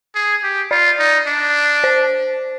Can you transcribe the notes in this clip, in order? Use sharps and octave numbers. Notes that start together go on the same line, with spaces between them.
G#4
G4
F4 D5
D#4
D4
C5